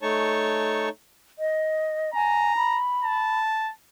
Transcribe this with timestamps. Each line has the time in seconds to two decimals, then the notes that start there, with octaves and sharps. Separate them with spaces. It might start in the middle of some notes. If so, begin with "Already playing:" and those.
0.02 A3 D#4 C#5 A5 C#6
1.39 D#5
2.15 G#5 A#5
2.57 B5
3.04 A5